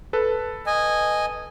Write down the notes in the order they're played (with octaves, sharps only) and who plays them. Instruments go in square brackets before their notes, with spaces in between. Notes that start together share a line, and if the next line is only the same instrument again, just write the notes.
[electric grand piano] A4 B4
[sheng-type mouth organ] D#5 G#5